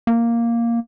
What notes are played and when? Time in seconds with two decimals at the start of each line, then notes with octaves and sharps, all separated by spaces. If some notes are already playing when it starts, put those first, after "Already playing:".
0.07 A#3